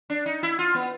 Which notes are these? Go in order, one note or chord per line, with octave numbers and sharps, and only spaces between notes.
D4
D#4
E4
F4
B3